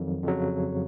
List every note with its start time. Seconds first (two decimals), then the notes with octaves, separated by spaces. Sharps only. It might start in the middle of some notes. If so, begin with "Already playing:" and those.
Already playing: F2 D#3 F#3
0.24 F2 C#3 F#3